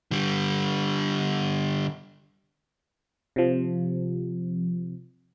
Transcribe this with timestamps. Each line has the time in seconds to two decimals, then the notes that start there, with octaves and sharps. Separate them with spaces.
0.11 D3 G3
3.36 C3 F3